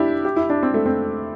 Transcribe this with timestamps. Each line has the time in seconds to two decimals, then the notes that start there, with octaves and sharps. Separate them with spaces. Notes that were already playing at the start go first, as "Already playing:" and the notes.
Already playing: D4 E4 G4
0.25 G4
0.36 E4
0.50 D4
0.63 C4
0.74 A3
0.86 C4